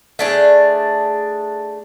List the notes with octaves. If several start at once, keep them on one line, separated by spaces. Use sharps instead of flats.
A3 D4 G#4